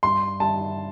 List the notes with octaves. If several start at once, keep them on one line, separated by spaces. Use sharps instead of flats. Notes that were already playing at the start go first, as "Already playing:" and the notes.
G2 C6
G2 A5